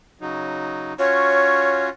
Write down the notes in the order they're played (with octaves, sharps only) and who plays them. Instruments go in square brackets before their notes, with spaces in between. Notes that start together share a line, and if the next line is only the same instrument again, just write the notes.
[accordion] C#3 F#3 D#4
[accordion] C#4 F4 F#4 [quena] C#5